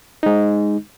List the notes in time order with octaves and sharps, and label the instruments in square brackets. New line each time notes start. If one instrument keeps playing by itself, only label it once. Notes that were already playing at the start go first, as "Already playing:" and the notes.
[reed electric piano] G#3 D#4